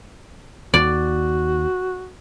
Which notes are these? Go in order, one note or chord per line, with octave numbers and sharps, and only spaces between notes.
D#2 F#4 D5